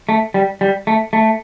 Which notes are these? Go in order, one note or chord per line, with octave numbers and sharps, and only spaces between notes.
A3
G3
G3
A3
A3